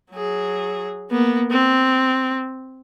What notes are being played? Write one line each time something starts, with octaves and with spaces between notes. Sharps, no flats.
F#3 G#4
A#3 B3
C4